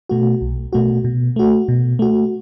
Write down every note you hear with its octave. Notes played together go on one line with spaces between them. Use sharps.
B2 A3 F#4
B1
B2 A3 F#4
B2
A3 F#4
B2
A3 F#4